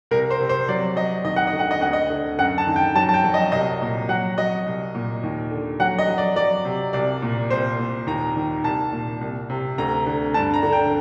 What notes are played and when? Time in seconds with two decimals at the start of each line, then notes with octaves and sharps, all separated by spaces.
0.11 C2 A#4
0.30 C5
0.40 C3
0.49 C5
0.68 F#3 D5
0.96 F#3 D#5
1.24 D#2 D#5
1.36 F#5
1.47 D#5
1.53 D3
1.59 F#5
1.71 D#5
1.81 D2 F#5
1.93 D#5
2.10 D3
2.39 F#2 F#5
2.58 A5
2.67 D#3
2.76 G5
2.95 F#3 A5
3.09 A5
3.14 G5
3.24 F#3
3.34 D#5
3.52 C2 D#5
3.81 A#2
4.09 F#3 F#5
4.38 F#3 D#5
4.66 C2
4.95 A#2
5.23 D#2
5.51 D3
5.80 F#3 F#5
5.98 D#5
6.08 F#3
6.18 D5
6.36 F#3 D5
6.65 C3
6.93 C2 D5
7.22 A#2
7.50 C2 C5
7.78 A#2
8.07 D#2 A#5
8.36 D#3
8.64 C2 A5
8.92 A#2
9.21 C2
9.50 C3
9.78 D2 A#5
10.06 D3
10.34 G2 A5
10.54 A#5
10.63 D3
10.72 G5